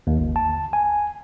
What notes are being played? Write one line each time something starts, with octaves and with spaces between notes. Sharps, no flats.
D#2
G1
A5
G#5